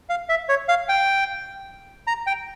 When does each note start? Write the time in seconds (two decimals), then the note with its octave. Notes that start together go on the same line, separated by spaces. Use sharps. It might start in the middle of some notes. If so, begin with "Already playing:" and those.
0.09 F5
0.29 E5
0.49 C#5
0.69 F5
0.89 G5
2.07 A#5
2.27 G5